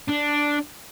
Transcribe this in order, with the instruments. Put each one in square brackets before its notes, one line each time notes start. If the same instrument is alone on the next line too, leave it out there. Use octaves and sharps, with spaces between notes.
[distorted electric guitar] D4